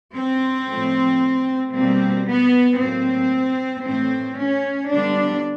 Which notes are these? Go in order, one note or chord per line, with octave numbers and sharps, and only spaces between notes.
C4
A2 F3 A3
B2 G3 A#3 C4
B3
A2 F#3 A#3 C4
A2 E3 A3 C4
C#4
D3 G3 B3 D4